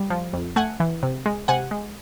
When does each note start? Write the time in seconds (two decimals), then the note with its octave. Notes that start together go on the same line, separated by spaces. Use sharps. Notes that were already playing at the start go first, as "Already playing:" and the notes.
Already playing: G3
0.10 F3
0.33 F2
0.56 A3 F#5 G#5
0.80 E3
1.03 C3
1.26 G#3
1.48 C3 F#5 G#5
1.71 G#3